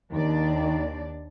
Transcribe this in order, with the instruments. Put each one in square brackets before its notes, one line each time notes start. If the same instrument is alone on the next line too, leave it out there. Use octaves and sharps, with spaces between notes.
[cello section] D#2 D4 D5 [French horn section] D#3